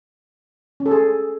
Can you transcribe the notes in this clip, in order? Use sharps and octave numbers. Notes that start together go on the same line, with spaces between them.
C#4
A4
G#4